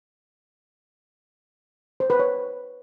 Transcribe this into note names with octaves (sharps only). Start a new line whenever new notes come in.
C5
B4
C#5